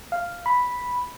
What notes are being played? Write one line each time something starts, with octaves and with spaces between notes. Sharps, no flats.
F5
B5